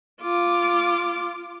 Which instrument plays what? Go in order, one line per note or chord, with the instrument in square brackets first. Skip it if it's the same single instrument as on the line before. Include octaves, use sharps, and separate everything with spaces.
[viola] F4 D6